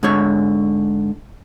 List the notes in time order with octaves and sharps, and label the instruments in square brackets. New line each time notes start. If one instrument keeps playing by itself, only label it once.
[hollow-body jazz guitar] G#2 D3 C#5